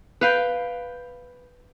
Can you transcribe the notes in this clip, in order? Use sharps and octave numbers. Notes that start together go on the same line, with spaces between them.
B4 F5 G5